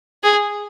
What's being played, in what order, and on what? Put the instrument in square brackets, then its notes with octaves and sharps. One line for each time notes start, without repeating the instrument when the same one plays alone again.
[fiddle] G#4